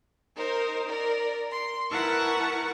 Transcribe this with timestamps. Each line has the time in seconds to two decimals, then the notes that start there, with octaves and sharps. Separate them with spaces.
0.36 D#4 A#4 C5
0.88 A#4 D5
1.50 C6
1.90 E4 A#4 B4 F#5 A5 C#6